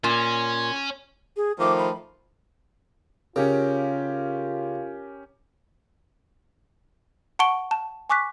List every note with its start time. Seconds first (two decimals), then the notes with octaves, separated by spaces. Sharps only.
0.04 A#2 C#4
1.37 G#4
1.60 D#3 F3 A3 D6
1.79 B5
3.36 C#3 C#4 F4 G4 A#4
7.39 F#5 A5 C#6 D7 G7
7.71 A5
8.10 G#5 C#6 D6 F#6 B6